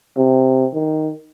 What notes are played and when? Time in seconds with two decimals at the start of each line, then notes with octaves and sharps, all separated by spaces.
0.17 C3
0.73 D#3